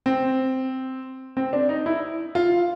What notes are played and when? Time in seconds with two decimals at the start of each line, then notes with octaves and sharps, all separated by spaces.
0.06 C4
1.37 C4
1.53 D4
1.69 D#4
1.86 E4
2.35 F4